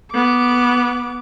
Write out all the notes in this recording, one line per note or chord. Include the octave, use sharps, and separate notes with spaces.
B3 D6